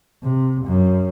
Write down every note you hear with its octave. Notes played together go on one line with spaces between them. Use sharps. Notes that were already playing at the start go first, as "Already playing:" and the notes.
C3
F#2